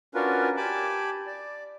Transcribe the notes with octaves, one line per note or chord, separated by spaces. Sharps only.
C#4 D4 F4 F#4 A#4 B4
G4 G#5 A5 B5 D6
D5